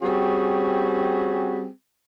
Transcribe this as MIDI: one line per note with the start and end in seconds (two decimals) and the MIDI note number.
0.02 1.66 55
0.02 1.66 60
0.02 1.66 61
0.02 1.66 66
0.02 1.66 68